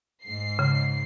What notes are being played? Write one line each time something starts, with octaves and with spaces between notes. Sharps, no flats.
G#2 C7
C#3